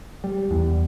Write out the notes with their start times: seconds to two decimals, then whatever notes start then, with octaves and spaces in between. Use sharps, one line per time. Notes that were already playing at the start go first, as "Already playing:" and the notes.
0.24 G3
0.51 E2